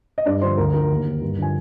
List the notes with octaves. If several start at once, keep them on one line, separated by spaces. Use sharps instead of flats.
D#5
G2 D4 D5
D3 F3 C5 C6
D2 A#4 A#5
D3 F3 A#4 A#5
D#2
D#3
G2
D3 F3 G#5